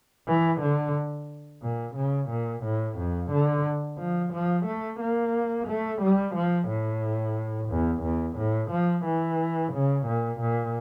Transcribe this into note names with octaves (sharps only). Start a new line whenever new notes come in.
E3
D3
A#2
C#3
A#2
A2
F2
D3
F3
F3
A3
A#3
A3
G3
F3
A2
E2
E2
A2
F3
E3
C#3
A#2
A#2